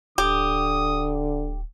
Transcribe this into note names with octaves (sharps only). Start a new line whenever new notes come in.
D1 D3 G4 D#6